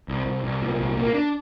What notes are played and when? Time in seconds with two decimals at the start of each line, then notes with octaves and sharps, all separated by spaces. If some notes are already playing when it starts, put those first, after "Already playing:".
0.08 C2
0.26 C2
0.44 C2
0.62 A#2
0.79 C2
0.97 A#3
1.14 D4